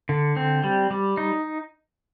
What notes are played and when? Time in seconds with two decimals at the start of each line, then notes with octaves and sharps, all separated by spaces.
0.09 D3
0.37 C4
0.64 G3
0.91 G3
1.17 D#4